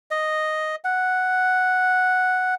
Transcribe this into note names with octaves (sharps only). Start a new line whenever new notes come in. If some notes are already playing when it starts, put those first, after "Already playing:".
D#5
F#5